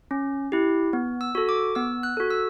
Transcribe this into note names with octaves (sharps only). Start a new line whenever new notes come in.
C#4
E4 G4
B3
E6
F#4 A4
D6
B3 E6
F#6
F#4 A4
E6